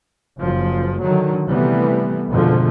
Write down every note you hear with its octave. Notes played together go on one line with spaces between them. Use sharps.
F#1 F3
D3 D#3 F#3
C3 E3 G3 A3 B3
F2 G#2 B2 D3 F3 A3